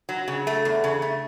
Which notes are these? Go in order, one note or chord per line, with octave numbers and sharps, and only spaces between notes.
F#3
C#3
A3
E2
C#3
A3